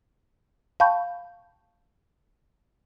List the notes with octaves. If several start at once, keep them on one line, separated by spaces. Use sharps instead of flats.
F5 G5 A5 B5 C#6 G6